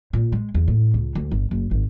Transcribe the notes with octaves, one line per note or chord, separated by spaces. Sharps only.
A#2
G#3
E2
A2
C#2
D2
G1
F#1
G#1